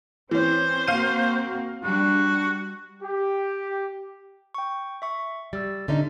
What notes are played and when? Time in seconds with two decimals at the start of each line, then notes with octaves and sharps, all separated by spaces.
0.31 E3 C4 C#4 C5
0.88 A#3 C4 F#4 F5 D#7
1.83 G3 D4 F#4
3.02 G4
4.54 G5 C#6
5.02 E5 C#6
5.53 G3 E6 A6
5.88 D3 C#4 D#4 E5